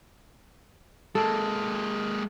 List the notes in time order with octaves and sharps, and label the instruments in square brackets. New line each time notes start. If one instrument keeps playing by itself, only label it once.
[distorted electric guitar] G#3 A#3 [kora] A4